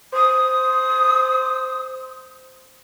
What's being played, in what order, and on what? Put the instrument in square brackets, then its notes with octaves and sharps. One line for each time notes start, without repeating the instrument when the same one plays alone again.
[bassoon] C5 [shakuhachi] D#6